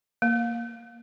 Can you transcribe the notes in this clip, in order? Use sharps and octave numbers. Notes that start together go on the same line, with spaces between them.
A#3